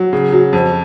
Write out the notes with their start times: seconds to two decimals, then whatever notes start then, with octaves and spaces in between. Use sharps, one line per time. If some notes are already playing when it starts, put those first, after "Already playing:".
Already playing: F#3
0.13 C#3
0.33 F#3
0.53 F2